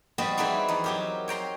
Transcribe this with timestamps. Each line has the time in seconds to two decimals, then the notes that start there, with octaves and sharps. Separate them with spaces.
0.18 G3 B3 C4 F#4 D#5
0.38 E3 C4 D#4 E4 G#4 B4
0.68 E2 D#4
0.84 F#3 G4 A#4
1.28 C#5 G5 A#5 C6